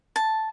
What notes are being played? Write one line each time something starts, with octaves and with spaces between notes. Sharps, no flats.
A5